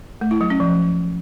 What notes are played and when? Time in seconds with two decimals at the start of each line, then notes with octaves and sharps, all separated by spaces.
0.21 A3
0.31 E4
0.41 F#3
0.50 C#4
0.60 F3